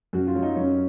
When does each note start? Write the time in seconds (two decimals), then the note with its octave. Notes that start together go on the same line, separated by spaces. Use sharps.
0.13 F#2 F#4
0.27 F4
0.35 F#3
0.42 D#4
0.56 F#2 C#4